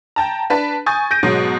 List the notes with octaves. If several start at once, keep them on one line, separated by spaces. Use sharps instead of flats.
G5 A5 A#5
D4 B4 A5
G#5 C#6 D#6 G6 A6
G6 A#6 D7 D#7
G#2 B2 F#3 G#3